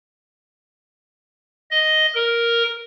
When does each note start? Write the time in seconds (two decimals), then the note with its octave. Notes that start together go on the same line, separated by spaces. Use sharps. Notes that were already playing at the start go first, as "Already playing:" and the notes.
1.71 D#5
2.15 A#4